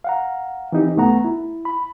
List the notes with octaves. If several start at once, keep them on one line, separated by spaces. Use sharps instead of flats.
F5 F#5 A#5
E3 C4 D#4 G4
C2 A3 B3 F#5 A#5
E4
B5